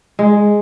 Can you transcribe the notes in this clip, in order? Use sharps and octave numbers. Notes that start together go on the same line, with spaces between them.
G#3